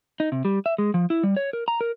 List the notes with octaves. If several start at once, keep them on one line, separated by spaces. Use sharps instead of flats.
D#4
C3
G3
E5
G#3
F3
E4
G3
C#5
A#4
A#5
A#4